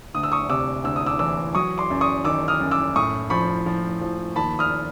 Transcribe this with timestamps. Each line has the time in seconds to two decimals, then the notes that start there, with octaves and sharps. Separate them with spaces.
0.14 D2 D#6
0.23 E6
0.32 C#6 D#6
0.49 C3 D6 E6
0.84 D2 E6
0.96 D#6
1.06 D6 E6
1.19 E3 D6 E6
1.55 F#3 C#6 D#6
1.78 C6 D6
1.90 F#2
2.01 C#6 D#6
2.25 D#3 D6 E6
2.48 D#6 F6
2.61 F#2
2.71 D6 E6
2.96 A2 C#6 D#6
3.30 F3 B5 C#6
3.66 F3
4.01 F3
4.36 D#2 A5 B5
4.59 D#6 F6